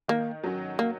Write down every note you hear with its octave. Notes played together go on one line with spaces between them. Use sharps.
D#3 A#3
F#3 C#4 F#4
A#3